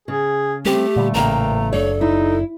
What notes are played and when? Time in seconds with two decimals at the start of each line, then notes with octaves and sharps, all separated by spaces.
0.08 C#3 G#4
0.65 G3 A3 A#3 C4 G4
0.96 A#2 D3 G3
1.14 A1 A#2 C#3 A#3 G5 A#5
1.73 F#1 D4 A4 C#5
2.01 D#4 E4